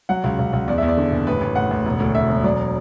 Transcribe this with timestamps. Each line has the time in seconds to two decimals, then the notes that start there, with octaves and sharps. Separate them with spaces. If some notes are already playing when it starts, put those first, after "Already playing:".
0.09 F#3 F#5
0.24 C#2
0.39 C#2
0.53 C#2
0.68 E2 D5
0.78 E2 E5
0.88 D5
0.97 D3
1.12 F#1
1.27 A1 B4
1.41 A1
1.55 A1 F#5
1.71 A1
1.86 E1
2.00 D2
2.15 E1 E5
2.29 E1
2.44 F#3 D5